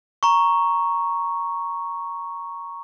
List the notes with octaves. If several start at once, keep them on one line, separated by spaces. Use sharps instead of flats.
A#5 C#6